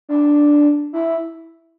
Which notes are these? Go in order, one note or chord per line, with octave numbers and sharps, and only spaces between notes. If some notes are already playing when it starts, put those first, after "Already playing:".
D4
E4